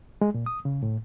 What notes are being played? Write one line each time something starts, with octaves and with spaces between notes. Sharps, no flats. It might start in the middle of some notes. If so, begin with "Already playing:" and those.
G#3
A#2
D#6
C#3
A2